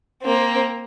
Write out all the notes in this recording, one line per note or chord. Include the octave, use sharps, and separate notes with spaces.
A#3 C4